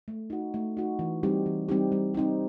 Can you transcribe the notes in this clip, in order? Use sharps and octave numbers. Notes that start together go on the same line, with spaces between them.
A3
D#4 F#4
A3
D#4 F#4
E3
G3 C4 D#4 G4
E3
G3 C4 D#4 G4
G3
C4 D#4 G4